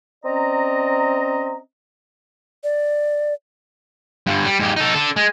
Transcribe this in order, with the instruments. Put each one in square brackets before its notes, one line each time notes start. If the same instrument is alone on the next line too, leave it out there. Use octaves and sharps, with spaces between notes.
[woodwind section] C4 C#4 D5 D#5 A#5
[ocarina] D5
[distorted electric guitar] G2 D3
G3
G#2 G4
D#4 A4
D4 A4
G#3